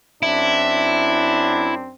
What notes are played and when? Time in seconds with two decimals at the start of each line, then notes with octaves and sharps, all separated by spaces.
0.23 F#2 C4 D4 E4